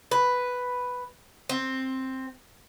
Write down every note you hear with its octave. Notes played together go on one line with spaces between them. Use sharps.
B4
C4